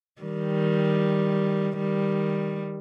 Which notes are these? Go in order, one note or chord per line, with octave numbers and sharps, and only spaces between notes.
D#3 G3
D#3 G3